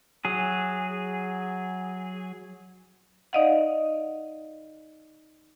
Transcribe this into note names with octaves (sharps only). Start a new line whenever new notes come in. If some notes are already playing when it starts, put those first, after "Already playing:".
F#3 G#4
D#4 D5 D#5 F5 F#5